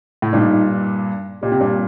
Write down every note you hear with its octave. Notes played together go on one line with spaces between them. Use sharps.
A2
G2 A#2 D#4
A#2 G4
C3
G2 A#2